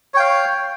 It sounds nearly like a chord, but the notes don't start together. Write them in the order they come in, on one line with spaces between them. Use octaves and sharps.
C#5 G5 F5